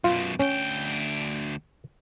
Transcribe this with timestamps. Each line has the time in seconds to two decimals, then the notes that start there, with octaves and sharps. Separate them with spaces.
0.04 F#2 B2 F4
0.39 D2 C#4 G5